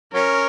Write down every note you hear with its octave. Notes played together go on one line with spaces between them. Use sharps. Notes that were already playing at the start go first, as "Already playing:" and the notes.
F#3 C#4 A#4